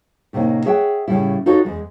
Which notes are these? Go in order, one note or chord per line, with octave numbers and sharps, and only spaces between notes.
A2 C3 A#3 C#4 D#4
G#4 C#5 E5 F#5 G5
A2 C#3 F3 G3 E4
D#4 F4 F#4 A4 C#5
E2 G#3